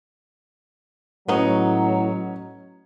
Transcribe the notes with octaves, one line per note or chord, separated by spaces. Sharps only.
A2 F#3 B3 C#4 D#4 C#5